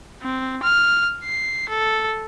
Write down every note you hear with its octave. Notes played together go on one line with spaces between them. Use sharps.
C4
F6
C7
A4